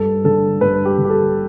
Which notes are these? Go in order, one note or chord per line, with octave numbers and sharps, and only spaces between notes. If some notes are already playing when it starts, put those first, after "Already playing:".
Already playing: G2 A4
D3 A4
G2 B4
G4
D3
G4
A4